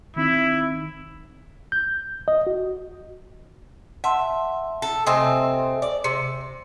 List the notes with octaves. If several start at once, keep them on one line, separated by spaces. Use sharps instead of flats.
D#3 C4 D#4 E4
G6
D#5
F#4
E5 F#5 A5 C6
A4
C3 A3 C4 D#5 G#5 D#6
D5
C3 C#7